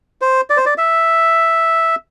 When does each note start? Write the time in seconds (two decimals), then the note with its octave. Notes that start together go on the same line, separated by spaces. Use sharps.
0.21 C5
0.50 D5
0.57 C5
0.66 D5
0.78 E5